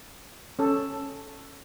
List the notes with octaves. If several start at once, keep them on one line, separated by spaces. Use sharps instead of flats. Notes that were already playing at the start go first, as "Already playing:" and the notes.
C#4 A4